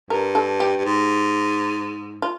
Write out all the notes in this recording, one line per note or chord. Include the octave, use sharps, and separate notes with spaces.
G2 A#4
A4
G4
G2
G#2
F4